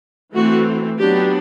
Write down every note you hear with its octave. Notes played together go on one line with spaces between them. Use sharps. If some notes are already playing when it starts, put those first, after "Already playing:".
E3 A3 C4 F#4
F#3 B3 D4 G4